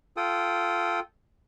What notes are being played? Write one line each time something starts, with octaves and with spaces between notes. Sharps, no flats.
F4 A4 G5 D#6